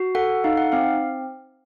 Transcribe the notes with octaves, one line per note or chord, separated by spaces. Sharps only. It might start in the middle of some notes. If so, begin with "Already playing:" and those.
Already playing: F#4
A4 F#5
D#4 F5
F#5
C4 F5